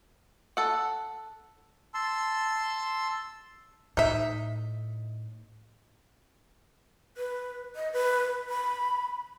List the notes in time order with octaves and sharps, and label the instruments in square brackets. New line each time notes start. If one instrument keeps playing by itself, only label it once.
[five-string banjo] A4 F#5
[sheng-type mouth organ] A5 C6 E6
[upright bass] A2 [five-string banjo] D#4 E5
[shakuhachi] B4
D#5
B4
B5